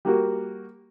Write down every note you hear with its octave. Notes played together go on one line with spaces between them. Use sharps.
G3 A#3 F#4